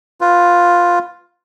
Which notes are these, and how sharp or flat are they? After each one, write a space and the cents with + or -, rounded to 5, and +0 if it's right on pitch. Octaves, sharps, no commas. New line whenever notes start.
F4 +10 B4 +15